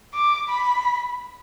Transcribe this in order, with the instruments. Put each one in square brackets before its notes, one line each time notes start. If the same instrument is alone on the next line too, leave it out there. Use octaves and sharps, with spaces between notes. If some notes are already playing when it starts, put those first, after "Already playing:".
[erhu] D6
B5